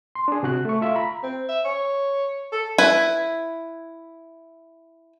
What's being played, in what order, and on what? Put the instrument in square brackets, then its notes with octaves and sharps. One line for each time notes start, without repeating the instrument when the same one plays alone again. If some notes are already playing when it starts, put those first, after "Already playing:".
[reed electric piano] C6
D4 G#4
C3 F#4 F#6
A3 C#6
F4 E5 F5
A#5 B5
[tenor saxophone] C4
E5
C#5
A4
[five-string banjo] E4 B4